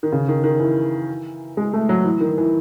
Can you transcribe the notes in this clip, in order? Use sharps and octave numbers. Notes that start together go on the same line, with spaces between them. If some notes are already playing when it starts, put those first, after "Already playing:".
D#3
C#3
D#3
D#3
E3
G#3
A3
F#3
E3
D#3
E3